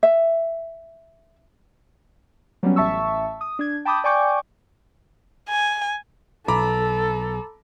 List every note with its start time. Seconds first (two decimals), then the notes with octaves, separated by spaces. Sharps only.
0.03 E5
2.63 F#3 G3 B3 C#4
2.76 A1 E5 A5 C#6 E6
3.41 D#6
3.59 D4 G#6
3.85 G5 A5 B5 D6 D#6 G6
4.04 D5 G5 G#5 C#6 D6 G6
5.49 G#5
6.48 B1 A4 A#5 B5 D6